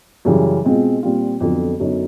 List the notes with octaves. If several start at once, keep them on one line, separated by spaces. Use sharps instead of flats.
F#2 C#3 E3 G3
B2 G#3 C4 F4
A#2 G3 C4 F4
F2 D3 F#3 B3
F#2 D3 F#3 B3 D#4